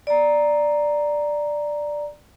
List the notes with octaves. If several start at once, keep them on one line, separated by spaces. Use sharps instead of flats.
D5 A#5